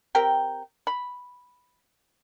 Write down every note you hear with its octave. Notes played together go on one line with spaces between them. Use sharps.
C4 G4 A#4 G5
B5